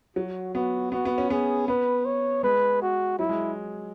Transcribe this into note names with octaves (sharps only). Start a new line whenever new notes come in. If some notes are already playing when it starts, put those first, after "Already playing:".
F#3 F#4
B3 F#4
B3 F#4
B3
C#4
B3 G#4
B3 B4
C#5
G#3 B4
F#4
F#3 E4
G#3